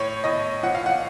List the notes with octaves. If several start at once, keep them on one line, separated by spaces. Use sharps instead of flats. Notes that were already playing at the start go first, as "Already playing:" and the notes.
Already playing: A2 C#5
A2 D#5
F3 F#5
F5
F#5